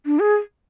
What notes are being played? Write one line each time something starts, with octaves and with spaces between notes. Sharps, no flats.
D4
G#4